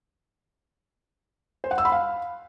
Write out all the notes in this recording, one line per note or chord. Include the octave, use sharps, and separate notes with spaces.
C5
F#5
E6
B5
F5